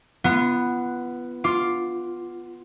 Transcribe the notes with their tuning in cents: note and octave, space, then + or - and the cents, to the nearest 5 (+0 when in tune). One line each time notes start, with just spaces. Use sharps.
B3 +0 F4 -35
F4 +0 D6 +0